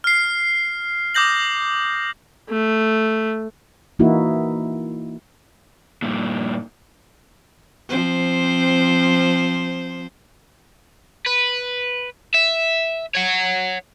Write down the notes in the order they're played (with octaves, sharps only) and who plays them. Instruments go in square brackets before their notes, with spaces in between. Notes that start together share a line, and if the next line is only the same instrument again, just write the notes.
[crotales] F6 C7
D6 D#6 G6 A#6 F#7
[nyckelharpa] A3
[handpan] E3 A#3 D#4 E4 F#4
[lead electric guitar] G2 A#2
[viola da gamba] F3 C4 C5
[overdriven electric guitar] B4
E5
C#5 F#5